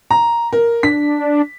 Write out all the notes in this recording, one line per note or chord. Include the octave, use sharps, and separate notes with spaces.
A#5
A#4
D4 B6